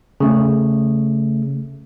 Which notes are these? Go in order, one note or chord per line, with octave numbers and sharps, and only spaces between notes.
C#3 A3